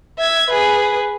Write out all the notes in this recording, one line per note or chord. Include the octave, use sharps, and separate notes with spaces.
E5 G#6
G#4 B4